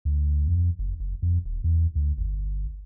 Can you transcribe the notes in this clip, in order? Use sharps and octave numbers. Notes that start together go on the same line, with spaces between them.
D2
F2
F#1
F#1
F2
D#1
E2
D2
G1